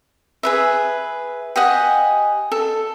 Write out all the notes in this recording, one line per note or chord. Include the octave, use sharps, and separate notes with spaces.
G#4 B4 E5
G4 D#5 F#5 G#5
A4